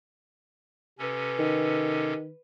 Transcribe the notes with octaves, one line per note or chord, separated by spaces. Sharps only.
C3 C#4 A4 B4
D#3